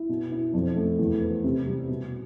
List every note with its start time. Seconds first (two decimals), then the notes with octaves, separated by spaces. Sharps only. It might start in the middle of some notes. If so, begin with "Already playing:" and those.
Already playing: E4
0.09 B2
0.32 E4
0.53 F2
0.76 A3
0.99 E2
1.21 B3
1.44 C3
1.66 G3
1.89 B2